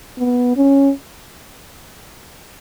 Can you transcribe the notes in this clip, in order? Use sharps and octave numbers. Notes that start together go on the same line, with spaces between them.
B3
C#4